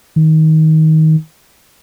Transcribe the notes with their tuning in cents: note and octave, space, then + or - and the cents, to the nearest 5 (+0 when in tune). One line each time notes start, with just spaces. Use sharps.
D#3 +20